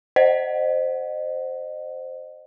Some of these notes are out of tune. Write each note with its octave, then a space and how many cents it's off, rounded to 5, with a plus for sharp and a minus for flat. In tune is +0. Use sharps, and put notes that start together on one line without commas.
C5 +0 D#5 -30 F#5 +0